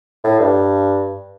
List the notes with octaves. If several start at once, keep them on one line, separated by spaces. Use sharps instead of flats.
A2
G2